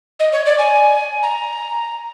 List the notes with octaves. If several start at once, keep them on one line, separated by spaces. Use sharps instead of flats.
D#5
C#5
D5
G#5
A#5